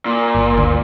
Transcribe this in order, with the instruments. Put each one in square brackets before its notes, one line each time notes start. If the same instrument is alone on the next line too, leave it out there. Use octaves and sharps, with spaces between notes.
[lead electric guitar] A#2
[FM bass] G1
D2